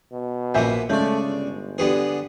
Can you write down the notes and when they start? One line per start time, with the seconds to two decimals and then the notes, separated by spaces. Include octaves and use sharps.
0.12 B2
0.54 A#1 A#3 B3 E5 G#5 G6
0.90 C#3 G#3 A3 D5 G6
1.26 G1
1.78 D3 B3 D4 G4 G#4 B4